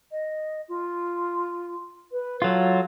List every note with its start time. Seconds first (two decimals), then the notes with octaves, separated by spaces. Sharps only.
0.12 D#5
0.68 F4
2.12 B4
2.42 F#3 F4 A4